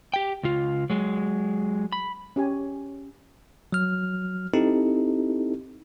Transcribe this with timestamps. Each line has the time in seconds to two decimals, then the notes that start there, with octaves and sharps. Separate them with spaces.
0.14 G4 G5
0.43 C#2 F4
0.90 F#3 G#3
1.92 B5
2.36 C#4 G4 G#5
3.73 F#3 F6
4.54 C4 D#4 E4 G4 A4